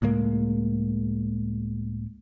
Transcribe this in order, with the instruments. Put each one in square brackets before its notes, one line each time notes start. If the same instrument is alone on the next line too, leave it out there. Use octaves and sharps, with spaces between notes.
[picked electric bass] C#2 A2 G#3 A#3